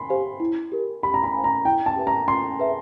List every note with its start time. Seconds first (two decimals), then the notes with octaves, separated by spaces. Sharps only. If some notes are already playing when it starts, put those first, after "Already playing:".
Already playing: B5 C6
0.08 G4 C5 F5 G#5
0.40 E4
0.72 G4 A#4
1.03 G4 B5
1.14 A#5
1.24 B5
1.34 C5 F5 G#5
1.44 A#5
1.65 E4 G5
1.86 A5
1.96 G4 B4 E5 A5
2.07 A#5
2.28 F4 C6
2.60 G#4 B4 E5